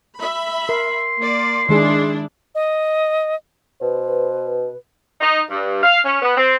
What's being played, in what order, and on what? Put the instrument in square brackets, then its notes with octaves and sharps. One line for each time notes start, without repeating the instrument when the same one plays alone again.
[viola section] E5 B5
[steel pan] A#4 [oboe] C6
[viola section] A#3 D5
[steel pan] D#3 G#3 G#4 [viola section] D4 E4
[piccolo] D#5
[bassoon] B2 [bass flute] B4 [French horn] C5
[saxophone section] D#4
G2
F5
C#4
B3
C4